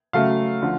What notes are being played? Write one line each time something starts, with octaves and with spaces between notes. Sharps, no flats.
C#3 F#3 A3 F5
D3 F3